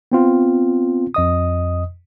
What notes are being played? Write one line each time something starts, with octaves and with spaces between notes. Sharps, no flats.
B3 C4 F4
F2 D#5 D#6